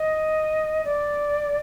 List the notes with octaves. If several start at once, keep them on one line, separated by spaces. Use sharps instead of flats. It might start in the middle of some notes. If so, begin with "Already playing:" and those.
Already playing: D#5
D5